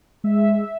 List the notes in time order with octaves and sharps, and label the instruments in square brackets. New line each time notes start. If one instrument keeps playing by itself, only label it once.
[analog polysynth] G#3 E5